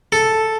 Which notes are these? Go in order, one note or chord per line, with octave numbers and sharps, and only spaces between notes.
A4